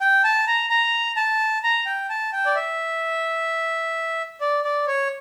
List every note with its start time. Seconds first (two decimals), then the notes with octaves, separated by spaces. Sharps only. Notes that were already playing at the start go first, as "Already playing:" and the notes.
0.01 G5
0.24 A5
0.47 A#5
0.70 A#5
1.16 A5
1.63 A#5
1.86 G5
2.10 A5
2.33 G5
2.46 D5
2.55 E5
4.41 D5
4.64 D5
4.87 C#5